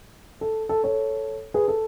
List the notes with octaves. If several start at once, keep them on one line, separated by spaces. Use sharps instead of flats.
A4
A4
A4 C#5
G#4 B4
A4